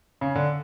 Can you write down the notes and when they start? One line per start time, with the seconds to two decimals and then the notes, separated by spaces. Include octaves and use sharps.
0.21 C#3
0.35 D3